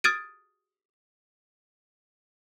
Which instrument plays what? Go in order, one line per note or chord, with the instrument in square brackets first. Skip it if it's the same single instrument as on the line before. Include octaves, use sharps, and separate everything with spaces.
[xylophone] D#6 F6 G#6 A6 D7 D#7